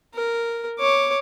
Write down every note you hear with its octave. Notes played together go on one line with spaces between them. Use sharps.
A#4
C#5 D6